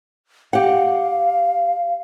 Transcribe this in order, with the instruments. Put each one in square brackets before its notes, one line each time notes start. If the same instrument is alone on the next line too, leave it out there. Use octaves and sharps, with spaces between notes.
[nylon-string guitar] G4 F#5 [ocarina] F5